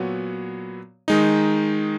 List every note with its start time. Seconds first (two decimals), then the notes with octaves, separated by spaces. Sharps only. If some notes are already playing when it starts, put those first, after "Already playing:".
Already playing: A#2 F#3 B3 F#4 C#5
1.08 D#3 G#3 D#4